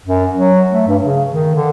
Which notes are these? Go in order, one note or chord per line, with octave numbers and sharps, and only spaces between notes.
F#2
F#3
A3
G2
C#3
D#3
D3